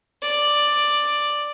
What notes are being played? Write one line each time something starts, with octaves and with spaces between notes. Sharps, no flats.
D5